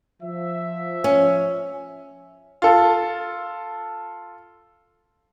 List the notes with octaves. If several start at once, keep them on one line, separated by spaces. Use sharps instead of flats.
F3 E5
C#4
F4 A4